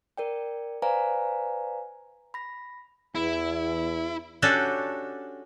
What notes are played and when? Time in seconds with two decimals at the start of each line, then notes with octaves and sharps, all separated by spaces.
0.17 A#4 D5 G5
0.82 B4 C5 D5 F5 G#5 A#5
2.34 B5 A#6
3.15 E2 E4
4.42 C#4 D4 F#4 G4 A4